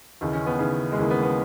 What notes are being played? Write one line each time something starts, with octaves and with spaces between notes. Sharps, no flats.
D#2 C#3 E3 D#4
C#4
B3
D#2 C#3 E3
G#3
D#2 C#3 E3 A#3
B3
B3